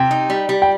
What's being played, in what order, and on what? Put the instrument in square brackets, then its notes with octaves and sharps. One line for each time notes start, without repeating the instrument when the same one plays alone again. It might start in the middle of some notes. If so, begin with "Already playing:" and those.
Already playing: [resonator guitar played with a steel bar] C3 [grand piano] G5
[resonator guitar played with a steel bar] D#4
G3
G3
[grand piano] G5